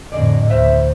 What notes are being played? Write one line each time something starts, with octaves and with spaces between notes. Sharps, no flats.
F2 A2 D3 G#4 D5 D#5
D2 C#3 E3 C5 E5